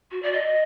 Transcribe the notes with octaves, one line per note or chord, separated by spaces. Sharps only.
F#4
D5
D#5